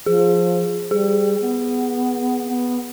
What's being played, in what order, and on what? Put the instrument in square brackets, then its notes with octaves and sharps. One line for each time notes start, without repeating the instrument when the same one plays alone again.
[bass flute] F3 [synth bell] G#4
[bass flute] G3 [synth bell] G#4
[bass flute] B3
B3